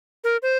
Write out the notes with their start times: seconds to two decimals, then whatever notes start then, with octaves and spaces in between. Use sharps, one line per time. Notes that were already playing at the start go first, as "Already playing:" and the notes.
0.24 A#4
0.42 C5